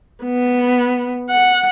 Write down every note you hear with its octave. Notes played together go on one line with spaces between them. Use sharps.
B3
F#5